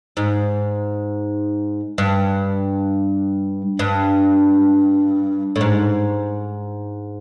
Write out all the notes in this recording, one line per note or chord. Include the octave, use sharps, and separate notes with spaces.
G#2
G2
G2
A2
G#2